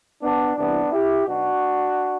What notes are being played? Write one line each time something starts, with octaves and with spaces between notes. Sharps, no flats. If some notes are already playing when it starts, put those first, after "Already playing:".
B3 D4
C2 C3 E3 B3 D4
E4 G4
B1 B2 D4 F#4